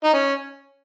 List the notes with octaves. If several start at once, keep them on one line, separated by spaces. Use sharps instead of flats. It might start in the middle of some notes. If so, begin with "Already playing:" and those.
D#4
C#4